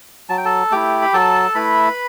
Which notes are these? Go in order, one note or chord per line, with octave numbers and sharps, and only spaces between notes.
F#3 A5
G5
A4 A5
A3 E4 G4 G5
B5
F#3 A4 A5
A3 E4 B4 B5